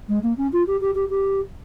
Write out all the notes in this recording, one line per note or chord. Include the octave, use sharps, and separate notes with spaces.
G#3
A#3
C#4
F4
G4
G4
G4
G4